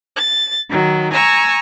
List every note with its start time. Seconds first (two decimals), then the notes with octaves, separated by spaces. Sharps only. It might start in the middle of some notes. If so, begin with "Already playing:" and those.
0.16 A6
0.69 D#3 F#3
1.13 G#5 A#5 C#6 E6